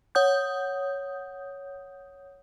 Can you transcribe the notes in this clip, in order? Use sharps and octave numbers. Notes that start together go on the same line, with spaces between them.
C#5 F#5 D#6 G6